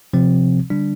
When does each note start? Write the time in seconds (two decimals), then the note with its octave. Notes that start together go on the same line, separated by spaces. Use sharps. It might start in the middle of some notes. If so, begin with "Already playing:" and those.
0.13 C3 F3 C4
0.70 D3 G3 D4